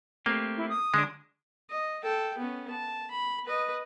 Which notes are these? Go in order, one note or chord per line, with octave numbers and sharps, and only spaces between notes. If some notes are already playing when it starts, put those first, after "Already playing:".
A3 A#3 C4 G4
E4
D#6
D3 G#3 C#4 D4
D#5
A4 G5
B3 C#4
A5
B5
B4 D#5